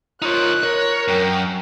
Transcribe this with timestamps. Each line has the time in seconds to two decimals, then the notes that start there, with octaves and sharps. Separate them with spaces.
0.22 D#4 F4 A#4 C5 C#5 F#6
0.63 A#4 C#5
1.08 F#2 G5